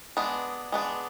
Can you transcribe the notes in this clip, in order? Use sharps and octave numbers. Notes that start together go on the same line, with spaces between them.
G#3 B3 D4
G#3 B3 D4